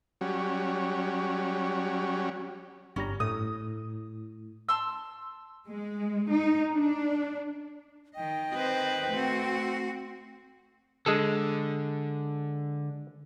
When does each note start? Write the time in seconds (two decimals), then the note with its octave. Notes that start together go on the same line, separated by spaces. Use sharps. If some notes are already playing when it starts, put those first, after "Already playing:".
0.21 F#3 G3 C#4
2.96 G1 G3 C#4 A#5
3.20 A2 D#6
4.69 A5 C6 E6
5.69 G#3
6.32 D#4
6.73 D4
8.16 D#3 D#5 G5
8.52 C4 B4 C5
9.11 A3 C4 F#4
11.06 D3 G#3 G#4 A4